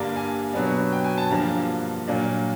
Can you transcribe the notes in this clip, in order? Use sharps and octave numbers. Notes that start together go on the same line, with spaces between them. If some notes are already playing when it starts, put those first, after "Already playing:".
Already playing: G2 D3 G3 A#3 D4 A#5
G#5
B2 F#3 B3 D4
G5
G#5
A5
G2 D3 F3 A#3 A#5
A#2 F#3 A#3 D4